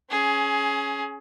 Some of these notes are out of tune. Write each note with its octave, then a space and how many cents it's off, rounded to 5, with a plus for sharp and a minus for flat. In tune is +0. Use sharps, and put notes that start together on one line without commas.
C#4 +0 G#4 +20